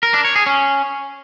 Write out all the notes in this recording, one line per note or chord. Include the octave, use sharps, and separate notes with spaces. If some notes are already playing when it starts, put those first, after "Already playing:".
A#4
D4
C#5
G#4
C#4